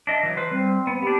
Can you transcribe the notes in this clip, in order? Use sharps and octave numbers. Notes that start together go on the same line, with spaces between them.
D4 D#5 E5
E3 F#3
B4 C5
G3 C4
B3
B3 D4 G4